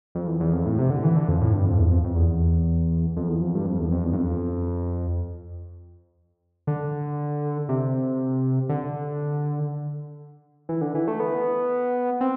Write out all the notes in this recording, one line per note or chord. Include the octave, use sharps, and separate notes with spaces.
F2
E2
E2
F2
A2
C3
D3
E3
D3
F2
A2
G2
F2
E2
F2
F2
E2
F2
E2
F2
G2
F2
E2
F2
E2
G2
F2
D3
C3
D3
E3
D3
E3
A3
B3
C4